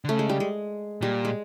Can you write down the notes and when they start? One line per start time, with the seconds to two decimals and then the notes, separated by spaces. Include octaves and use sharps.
0.05 D3
0.08 C#3 A3
0.19 G#3
0.29 G3
0.40 G#3
1.01 A#2 G3
1.25 G#3